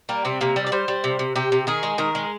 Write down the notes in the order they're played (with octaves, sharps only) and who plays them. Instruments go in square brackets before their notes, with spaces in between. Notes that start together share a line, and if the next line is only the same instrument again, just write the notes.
[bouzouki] G3 A#3
C3 C4
C3 A#3
G3
D5
G3 C5
G3
C3
C3
C3 G4
C3
D#3 G#4
G#3
D#3 A#4
G#3